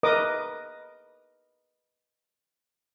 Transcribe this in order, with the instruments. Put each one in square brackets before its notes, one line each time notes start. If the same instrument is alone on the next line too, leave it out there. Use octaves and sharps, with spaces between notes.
[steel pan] A#4 B4 D#5 D6 D#6